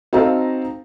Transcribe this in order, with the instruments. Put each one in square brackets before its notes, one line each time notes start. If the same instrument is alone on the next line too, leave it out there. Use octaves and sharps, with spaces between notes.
[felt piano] C4 D#4 F#4 A4 F5 A#5